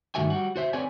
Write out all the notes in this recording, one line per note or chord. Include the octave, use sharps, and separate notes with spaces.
G2 D#3 A3 F#4 E5 G#5
G3 F#4
F#4 C5 E5
C4 G#4 B4 C#5 D5 G#5